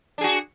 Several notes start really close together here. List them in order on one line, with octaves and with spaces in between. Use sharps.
D4 G#4 F#4